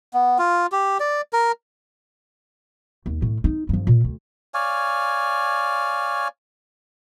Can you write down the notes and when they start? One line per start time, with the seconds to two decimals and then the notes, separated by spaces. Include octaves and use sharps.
0.13 B3
0.39 F4
0.72 G4
1.00 D5
1.33 A#4
3.06 D#2
3.22 A2
3.44 D#4
3.69 G2 F3
3.87 A#2
4.04 D2
4.54 C#5 D5 F5 G#5